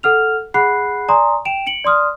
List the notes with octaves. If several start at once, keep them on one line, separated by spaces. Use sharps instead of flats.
A4 F#5 F6 F7
G#4 F#5 B5 F#6 C7
D5 G#5 A#5 C6 C#6 D#6
G5 D7 E7 F7
C#7 D7 F#7
D5 C6 D#6 F6